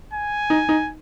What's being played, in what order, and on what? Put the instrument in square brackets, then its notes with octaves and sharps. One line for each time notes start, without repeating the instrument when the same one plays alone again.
[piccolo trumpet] G#5
[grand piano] D#4
D#4